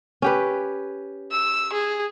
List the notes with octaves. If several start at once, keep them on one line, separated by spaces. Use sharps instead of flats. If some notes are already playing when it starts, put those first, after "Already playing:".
C#4 G4 B4
E6
G#4